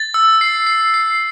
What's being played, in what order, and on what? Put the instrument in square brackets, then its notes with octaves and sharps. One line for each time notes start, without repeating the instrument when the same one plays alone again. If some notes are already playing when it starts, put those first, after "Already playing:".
Already playing: [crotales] A6
E6
C7
C7
C7